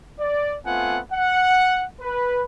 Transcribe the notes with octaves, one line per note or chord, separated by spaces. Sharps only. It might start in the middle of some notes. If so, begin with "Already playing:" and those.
D5
A3 B3 C4 F4 F#5 G#5
F#5
B4